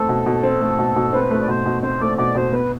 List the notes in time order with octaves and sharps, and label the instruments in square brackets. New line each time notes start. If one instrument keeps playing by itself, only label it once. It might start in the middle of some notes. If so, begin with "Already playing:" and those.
Already playing: [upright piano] A3 C4 [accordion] A4
[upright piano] B2
B2
C4
A3
B2
B2
[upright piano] C4 [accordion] B4
[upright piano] A3
[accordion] D5
[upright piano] B2 [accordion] C5
[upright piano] B2
[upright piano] C4 [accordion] C5
[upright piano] A3 [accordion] D5
[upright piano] B2 [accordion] D5
[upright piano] B2 [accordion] C5
[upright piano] B3 [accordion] B4